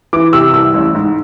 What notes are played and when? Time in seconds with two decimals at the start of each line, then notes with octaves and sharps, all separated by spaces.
0.13 E3 D6
0.33 C3 E6
0.54 C2 E6
0.74 A1
0.95 G#2